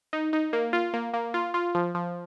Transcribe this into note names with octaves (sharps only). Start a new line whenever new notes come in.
D#4
D#4
A#3
F4
A#3
A#3
F4
F4
F3
F3